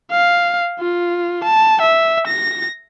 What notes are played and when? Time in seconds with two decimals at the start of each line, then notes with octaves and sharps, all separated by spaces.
0.11 F5
0.79 F4
1.44 A5
1.81 E5
2.27 A#6